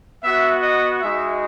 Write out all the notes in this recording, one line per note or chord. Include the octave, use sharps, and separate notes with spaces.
B3 F#4 E5
D#5
G#3 D#4 F#4 E5